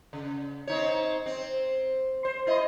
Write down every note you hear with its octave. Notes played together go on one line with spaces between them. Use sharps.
C#3
C4 D#4 C#5
C4
C5
E4 D#5